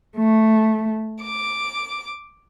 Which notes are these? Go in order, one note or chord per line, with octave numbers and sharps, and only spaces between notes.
A3
D6